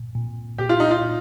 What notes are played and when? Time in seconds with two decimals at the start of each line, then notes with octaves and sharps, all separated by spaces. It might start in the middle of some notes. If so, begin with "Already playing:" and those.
Already playing: A#2
0.15 A#2
0.58 A#2 G4
0.69 F4
0.80 D#4
0.91 F4
1.02 A#2